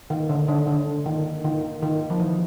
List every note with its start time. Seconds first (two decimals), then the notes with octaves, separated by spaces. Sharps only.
0.10 D#3
0.29 D3
0.48 D3
0.67 D3
1.06 D#3
1.44 D#3
1.83 D#3
2.10 F3
2.20 E3